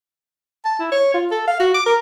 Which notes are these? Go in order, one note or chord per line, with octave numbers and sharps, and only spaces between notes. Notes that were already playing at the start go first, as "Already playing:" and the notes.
A5
E4
C#5
F4
A4
F5
F#4
D6
A#4